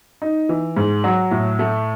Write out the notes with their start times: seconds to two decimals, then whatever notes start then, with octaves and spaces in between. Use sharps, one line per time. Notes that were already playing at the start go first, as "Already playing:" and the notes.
0.22 D#4
0.49 E3
0.77 G#2
1.04 F#3
1.31 A2
1.59 A3